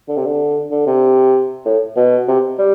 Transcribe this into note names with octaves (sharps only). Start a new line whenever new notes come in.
D3
C3
D3
D3
C3
A2
B2
C3
G3